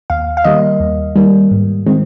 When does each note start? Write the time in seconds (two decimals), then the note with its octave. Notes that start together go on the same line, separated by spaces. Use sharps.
0.10 D#2 F5
0.37 F5
0.44 D#3 G3 A#3 D#5
0.80 D#2
1.16 D#3 G3 A#3
1.51 G#2
1.86 D#3 G#3 C4